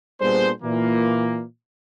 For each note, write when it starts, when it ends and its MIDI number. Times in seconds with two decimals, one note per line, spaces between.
0.21 0.50 46
0.21 0.50 55
0.21 0.50 59
0.21 0.50 62
0.21 0.50 68
0.21 0.50 72
0.63 1.42 46
0.63 1.42 52
0.63 1.42 58